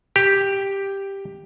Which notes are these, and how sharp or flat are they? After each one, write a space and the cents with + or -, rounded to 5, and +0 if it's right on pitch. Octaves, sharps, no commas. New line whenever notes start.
G4 +5